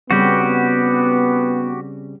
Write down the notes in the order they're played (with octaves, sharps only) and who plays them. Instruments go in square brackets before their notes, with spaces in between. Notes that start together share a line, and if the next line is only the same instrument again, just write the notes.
[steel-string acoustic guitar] C#3 G3 C4 [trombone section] B3 [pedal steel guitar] F#4 G4